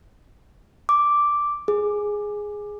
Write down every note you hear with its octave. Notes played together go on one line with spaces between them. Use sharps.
D6
G#4